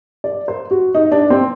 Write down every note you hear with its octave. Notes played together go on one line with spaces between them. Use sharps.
D5
C5
F#4
D#4
D4
C4